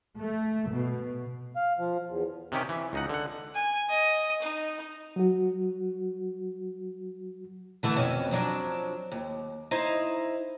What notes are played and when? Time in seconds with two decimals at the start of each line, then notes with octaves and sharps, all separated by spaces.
0.17 A3
0.70 B2
1.56 F5
1.78 F3
2.09 E2
2.52 C3 D#3 C#4 G4
2.69 E3
2.93 C#2 D#4 F#5
3.09 D3 F#5
3.54 G#5
3.89 D#5
4.42 D#4
5.16 F#3 F#4
7.83 D3 E3 A3
7.96 F2 B2 C#4
8.31 F3 F#3 D4
9.12 D#2
9.71 D#4 E4 C5